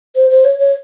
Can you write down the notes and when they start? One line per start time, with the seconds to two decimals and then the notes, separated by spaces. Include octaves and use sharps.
0.15 C5
0.30 C5
0.45 C#5
0.59 C#5